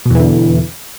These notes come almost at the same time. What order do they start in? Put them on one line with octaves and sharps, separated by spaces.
B2 E2 E3 D3